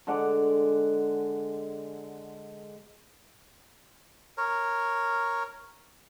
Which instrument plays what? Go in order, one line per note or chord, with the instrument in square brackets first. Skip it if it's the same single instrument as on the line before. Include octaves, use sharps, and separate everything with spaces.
[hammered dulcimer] D3 G#3 F#5 D6
[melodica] A#4 C#5